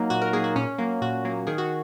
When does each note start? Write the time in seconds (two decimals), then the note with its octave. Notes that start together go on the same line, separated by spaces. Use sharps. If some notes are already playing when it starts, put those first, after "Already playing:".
Already playing: F#3 A#3 D#4
0.10 A#2 F#4
0.22 A#4
0.33 A#3 G#4
0.37 F#3
0.44 F#4
0.56 A#2 C#4
0.78 F#3 A#3
1.02 A#2 F#4
1.25 F#3 A#3
1.47 D#3 G#4
1.58 F#4